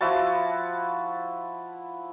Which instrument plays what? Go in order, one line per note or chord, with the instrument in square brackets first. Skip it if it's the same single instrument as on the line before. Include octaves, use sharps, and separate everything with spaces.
[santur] F3 E4 F#4 A5